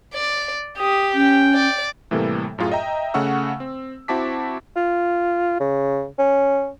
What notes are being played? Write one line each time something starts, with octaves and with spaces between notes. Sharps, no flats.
D5
G4 D#6
C#4 G5
D5
A2 C3 E3 G3 A#3 A4
F#2 A2 F4 G#4
D#5 E5 G5 A#5
C#3 A3 C#4 F#5 C#6 E6
C4
C4 E4 F#4 A5 D6 B6
F4
C#3
C#4